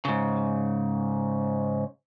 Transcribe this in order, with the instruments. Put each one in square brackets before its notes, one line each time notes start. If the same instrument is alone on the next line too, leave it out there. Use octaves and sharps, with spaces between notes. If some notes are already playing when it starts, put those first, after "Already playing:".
[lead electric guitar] G#2 C#3